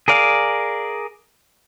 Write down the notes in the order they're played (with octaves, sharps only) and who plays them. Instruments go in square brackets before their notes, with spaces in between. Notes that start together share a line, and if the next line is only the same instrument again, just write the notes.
[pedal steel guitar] G#4 A#4 D5 F5